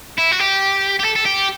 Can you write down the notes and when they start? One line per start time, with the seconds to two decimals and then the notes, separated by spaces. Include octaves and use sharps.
0.19 E4
0.32 F#4
0.40 G4
1.00 G4
1.05 A4
1.16 A4
1.26 G4